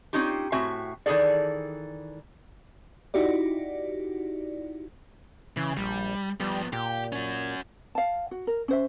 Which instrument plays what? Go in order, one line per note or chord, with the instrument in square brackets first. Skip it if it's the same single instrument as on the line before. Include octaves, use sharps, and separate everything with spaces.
[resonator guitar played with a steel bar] C4 C#4 D#4 F4 G4
A2 C4 F#4 E5 G#5
D#3 E3 G#4 A4 D5
[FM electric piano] D#4 E4 F#4 G4 D5
[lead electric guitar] C#3 [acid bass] E3
[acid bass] A#1 [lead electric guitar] G3
[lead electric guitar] F3 B3 [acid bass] G3
[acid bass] A#2 [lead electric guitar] G4
[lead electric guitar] C#4 F#4
[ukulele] F5 A5
F#4
A#4
C#4 C5 E5